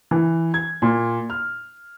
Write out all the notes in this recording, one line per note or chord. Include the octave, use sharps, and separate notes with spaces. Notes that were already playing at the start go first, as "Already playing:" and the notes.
E3
G#6
A#2
F6